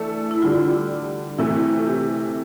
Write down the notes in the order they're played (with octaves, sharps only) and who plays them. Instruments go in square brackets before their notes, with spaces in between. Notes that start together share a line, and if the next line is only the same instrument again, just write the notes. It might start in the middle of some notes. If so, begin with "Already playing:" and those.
Already playing: [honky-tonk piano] E3 A3 D4 A4
[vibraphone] E4
[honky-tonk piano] D3 G3 D4 [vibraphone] F4
[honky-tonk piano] C3 E3 A3 [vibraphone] E4
[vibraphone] E4
F4
G4